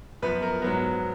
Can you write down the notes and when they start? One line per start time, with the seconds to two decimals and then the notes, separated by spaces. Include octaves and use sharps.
0.22 F#2 F3 B3 B4
0.42 A#4
0.62 G#2 F#3 B3 A#4